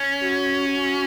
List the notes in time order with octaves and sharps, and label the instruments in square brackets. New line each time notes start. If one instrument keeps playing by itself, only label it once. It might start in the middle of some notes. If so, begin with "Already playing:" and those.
Already playing: [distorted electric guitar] C#4
[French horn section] F#4
F#4